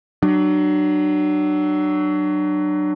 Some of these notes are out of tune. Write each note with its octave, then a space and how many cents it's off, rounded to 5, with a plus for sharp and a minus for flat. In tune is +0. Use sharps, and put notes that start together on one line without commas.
F#3 +25 D4 +30